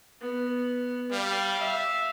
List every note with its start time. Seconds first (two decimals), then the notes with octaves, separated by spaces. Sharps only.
0.21 B3
1.12 G3 F5
1.60 E5